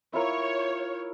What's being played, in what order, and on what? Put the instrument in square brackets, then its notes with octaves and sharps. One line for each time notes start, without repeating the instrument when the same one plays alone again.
[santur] E4 F4 A#4 [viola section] C#5